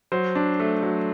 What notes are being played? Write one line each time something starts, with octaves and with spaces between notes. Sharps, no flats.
F#3 C5
D4
A3
F#3